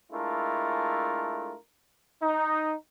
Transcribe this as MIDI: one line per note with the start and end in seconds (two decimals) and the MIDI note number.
0.12 1.55 56
0.12 1.55 57
0.12 1.55 62
0.12 1.55 64
0.12 1.55 65
0.12 1.55 70
2.23 2.73 63